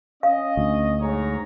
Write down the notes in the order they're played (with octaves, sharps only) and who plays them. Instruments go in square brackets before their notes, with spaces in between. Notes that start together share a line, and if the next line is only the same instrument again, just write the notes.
[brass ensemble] C#4 D#5 [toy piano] F5
[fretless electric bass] D2
[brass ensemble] G#2 C#5 A#5